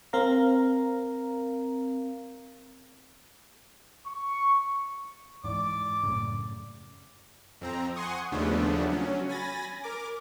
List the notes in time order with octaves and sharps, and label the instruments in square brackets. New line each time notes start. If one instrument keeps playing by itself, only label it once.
[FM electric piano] C4 A#4 F5 A#5
[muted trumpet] C#6
[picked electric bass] G#2 E3 [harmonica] D5 D6
[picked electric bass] F#2 A2 C#3
[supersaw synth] F2 C4 A#5
F#5 G#5 C6 C#6 D#6
D#2 C#3 F3 A3 B3 D4
F#3 C#4
G#5 B5 A6 A#6
A#4 D6